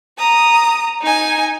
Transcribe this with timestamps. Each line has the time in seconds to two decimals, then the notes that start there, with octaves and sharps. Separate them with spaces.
0.18 A#5 D#6
1.02 D#4 G#5